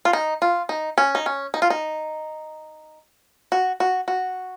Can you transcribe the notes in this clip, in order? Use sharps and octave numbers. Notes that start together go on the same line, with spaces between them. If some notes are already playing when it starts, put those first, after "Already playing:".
F4
D#4
F4
D#4
C#4
D#4
C#4
D#4
F4
D#4
F#4
F#4
F#4